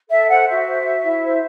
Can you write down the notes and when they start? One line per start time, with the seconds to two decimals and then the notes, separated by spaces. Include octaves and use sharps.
0.09 A4 E5
0.28 C5 F#5
0.47 F#4 E5
0.66 C5
0.86 F#4
1.05 E4
1.23 C5